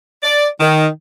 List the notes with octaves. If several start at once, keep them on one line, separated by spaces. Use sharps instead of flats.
D5
D#3